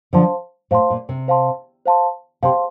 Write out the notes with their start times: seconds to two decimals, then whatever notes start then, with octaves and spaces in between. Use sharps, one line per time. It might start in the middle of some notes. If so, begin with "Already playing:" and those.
0.13 D3 F3 C5 F5 A5 C6
0.71 A2 C5 F5 A5 C6
0.90 A#2
1.09 C3
1.28 C5 F5 A5 C6
1.86 C5 F5 A5 C6
2.43 C3 C5 F5 A5 C6